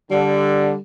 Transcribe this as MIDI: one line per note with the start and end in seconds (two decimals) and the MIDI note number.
0.11 0.74 50
0.11 0.79 55